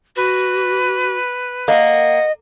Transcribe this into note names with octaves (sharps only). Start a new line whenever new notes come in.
F#4 B4
A#3 D#5 F#5